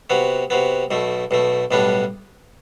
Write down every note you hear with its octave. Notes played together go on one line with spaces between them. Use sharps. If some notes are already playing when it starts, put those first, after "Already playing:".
C3 F#3 B3
C3 F#3 B3
B1 B2 A3
B1 B2 A3
B1 A2 G3 B3 D4